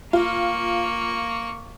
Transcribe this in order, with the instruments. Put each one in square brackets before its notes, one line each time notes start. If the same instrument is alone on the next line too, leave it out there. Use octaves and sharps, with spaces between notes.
[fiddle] A#3 C#6 [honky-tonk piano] F4